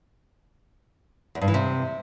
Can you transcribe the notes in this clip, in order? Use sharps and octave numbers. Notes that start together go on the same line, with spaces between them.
E2
G2
E3
C3